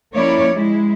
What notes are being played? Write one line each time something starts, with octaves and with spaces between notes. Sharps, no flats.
F3 A#3 C#4 E4 C#5 D5
G#3 E4